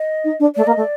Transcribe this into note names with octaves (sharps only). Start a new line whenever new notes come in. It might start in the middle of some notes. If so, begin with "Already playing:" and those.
Already playing: D#5
D#4
D4
A3 D5
A#3 D#5
A3
D5